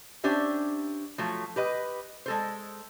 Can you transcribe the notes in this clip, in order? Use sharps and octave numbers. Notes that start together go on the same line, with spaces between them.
C#4 D4 G4 C5 E5
F3 F#3 A3
G4 B4 D#5
G#3 A4 C5